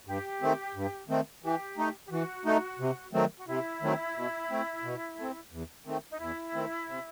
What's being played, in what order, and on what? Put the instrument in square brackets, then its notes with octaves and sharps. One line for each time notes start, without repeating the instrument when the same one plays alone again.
[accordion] G2 [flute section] G4
[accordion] D#3 A3 C4
G2
D#3 A3 C4
[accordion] E3 [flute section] G4
[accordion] A3 D#4
[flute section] G4
[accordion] E3 [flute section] F#4
[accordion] A3 D#4
C3
D#3 F#3 A3 C4
[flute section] F#4
[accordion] C3 [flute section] E4
[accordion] D#3 F#3 A3 C4
B2
A3 C4
B2
A3 C4
E2
D#3 A3 C4
[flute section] D#4
[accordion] E2 [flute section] E4
[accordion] D#3 A3 C4
C3